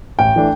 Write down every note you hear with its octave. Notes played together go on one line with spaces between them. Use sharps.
A1 G5
E3 A3 D4